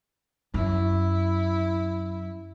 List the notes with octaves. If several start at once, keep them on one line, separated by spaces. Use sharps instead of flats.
F#2 E4